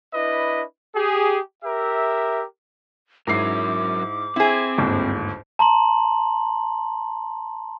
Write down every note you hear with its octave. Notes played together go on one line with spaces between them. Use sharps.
D4 E4 B4 D#5
G4 G#4
G4 A#4 E5
G#2 F#3 E4 A#4 D6 C7
C4 E4 G#4 C5
G1 D#2 G#2
A5 A#5 C6 F#7